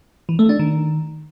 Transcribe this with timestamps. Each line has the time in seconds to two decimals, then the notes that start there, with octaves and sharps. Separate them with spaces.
0.29 E3
0.39 A3
0.49 D4
0.59 D#3